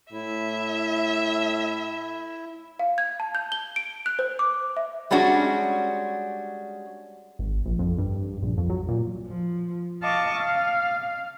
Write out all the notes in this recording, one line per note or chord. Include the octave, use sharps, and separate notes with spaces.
A2 E4 E5
F5
G#6
A5
G6
G7
D7
F#6
C5
D6
E5
G3 G#3 C#4 D4 F#4
G#1
A#1
F2
G2
A#1
F2
F#3
A#2
F3
D#5 F5 A5 C#6 D6
F5